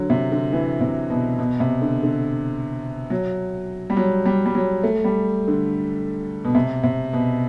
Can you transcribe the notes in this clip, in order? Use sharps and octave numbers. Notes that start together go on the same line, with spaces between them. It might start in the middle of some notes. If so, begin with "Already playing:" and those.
Already playing: D3 F#3
C3
D3
E3
C3
B2
B2
C3
D3
D3
F#3
G3
F#3
G3
G3
F#3
A3
G3
D3
B2
C3
C3
B2